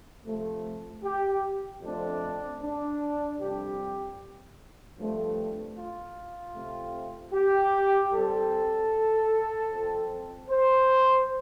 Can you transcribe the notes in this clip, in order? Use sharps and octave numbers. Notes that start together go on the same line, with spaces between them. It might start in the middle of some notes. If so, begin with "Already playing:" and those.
C3 F3 A3
G4
F2 F3 A3 C4 D4
D4
F2 C3 G3 C4 G4
G2 F3 A3 C4
F4
C3 A3 C4
G4
G2 G3 C4 A4
F2 F3 C4
C5